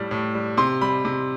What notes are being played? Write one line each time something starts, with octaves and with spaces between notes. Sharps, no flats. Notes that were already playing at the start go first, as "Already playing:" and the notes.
Already playing: A2 G3
A2
G3
C3 C6
G3 B5
C3